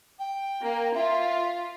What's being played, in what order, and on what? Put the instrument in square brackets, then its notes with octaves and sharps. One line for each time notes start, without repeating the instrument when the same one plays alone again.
[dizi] G5
[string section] A#3
[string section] F4 [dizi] E5